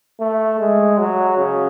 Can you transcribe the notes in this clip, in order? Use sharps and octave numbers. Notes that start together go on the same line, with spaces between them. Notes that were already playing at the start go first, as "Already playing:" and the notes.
A3
G#3
F#3
C#3